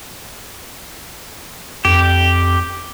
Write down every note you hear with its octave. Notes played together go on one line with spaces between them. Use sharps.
F2 G4